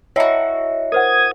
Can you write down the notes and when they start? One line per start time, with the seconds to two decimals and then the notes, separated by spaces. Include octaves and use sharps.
0.16 E4 F#4 C#5 D#5 E5
0.92 A#4 C5 F#5 D#6 G#6